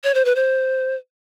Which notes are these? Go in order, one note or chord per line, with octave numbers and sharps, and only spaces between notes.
C#5
C5
B4
C5